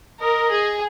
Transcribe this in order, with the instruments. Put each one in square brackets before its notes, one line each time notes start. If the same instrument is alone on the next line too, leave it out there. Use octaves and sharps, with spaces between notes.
[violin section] A#4 [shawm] D#5
[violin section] G#4